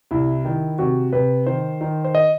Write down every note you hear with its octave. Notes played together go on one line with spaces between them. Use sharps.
C2 E4
D#3
C3 F#4
C3 B4
D#3 C5
D#3
C5
D#5